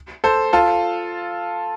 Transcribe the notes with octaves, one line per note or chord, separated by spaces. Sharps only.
A4 C5
F4 A4